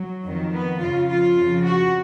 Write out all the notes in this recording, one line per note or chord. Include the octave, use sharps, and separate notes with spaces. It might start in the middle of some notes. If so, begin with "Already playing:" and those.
Already playing: F#3
F2 D#3
B3
F2 C#3 F3 F4
F4
F2 C#3 F3
F#4